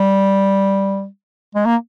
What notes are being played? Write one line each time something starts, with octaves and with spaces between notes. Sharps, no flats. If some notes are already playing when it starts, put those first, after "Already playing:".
Already playing: G3
G#3
A#3